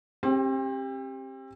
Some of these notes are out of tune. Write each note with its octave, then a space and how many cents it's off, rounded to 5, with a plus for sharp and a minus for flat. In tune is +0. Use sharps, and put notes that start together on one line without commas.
C4 +35 G4 +5